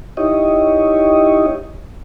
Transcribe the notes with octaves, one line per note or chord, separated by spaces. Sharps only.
D#4 E4 G4 C#5 D#5